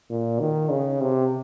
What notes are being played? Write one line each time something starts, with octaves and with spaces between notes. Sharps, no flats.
A#2
D#3
C#3
C3